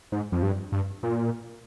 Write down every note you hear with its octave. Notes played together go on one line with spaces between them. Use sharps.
G#2
F2
G2
G2
A#2